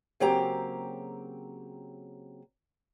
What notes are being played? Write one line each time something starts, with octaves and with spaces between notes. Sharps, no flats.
C#3 F#3 A#3 C4 G4 A#5